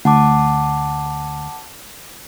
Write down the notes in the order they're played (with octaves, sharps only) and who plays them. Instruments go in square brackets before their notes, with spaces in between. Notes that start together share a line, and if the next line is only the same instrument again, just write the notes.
[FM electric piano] D2 [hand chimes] F#5 A5 D6